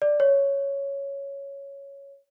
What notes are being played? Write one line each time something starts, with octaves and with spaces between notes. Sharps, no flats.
D5
C#5